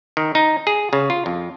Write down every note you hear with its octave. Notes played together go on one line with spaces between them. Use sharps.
D#3
D#4
G#4
C#3
F4
F2